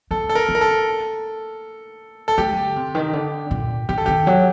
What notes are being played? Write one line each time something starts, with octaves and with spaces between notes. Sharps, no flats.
A#3 A4
A4
A#4
A#3
A#4
A4
A4
A3 G4
D3
C3
D#3
D3
A#2
D#3 G4
A4
D#3 G4
F#3